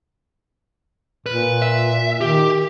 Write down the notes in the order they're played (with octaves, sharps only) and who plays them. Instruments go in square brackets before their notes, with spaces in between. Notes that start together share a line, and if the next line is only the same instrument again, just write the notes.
[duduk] A#2 [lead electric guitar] B4
[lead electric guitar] E5
[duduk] D#3 [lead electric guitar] G4